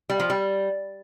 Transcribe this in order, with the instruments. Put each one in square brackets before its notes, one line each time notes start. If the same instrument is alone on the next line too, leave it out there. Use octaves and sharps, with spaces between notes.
[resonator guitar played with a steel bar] G3
F3
G3